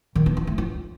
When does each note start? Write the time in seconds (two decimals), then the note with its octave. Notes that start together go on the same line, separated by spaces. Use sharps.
0.15 D#3
0.26 B3
0.37 F4
0.47 A3
0.58 F4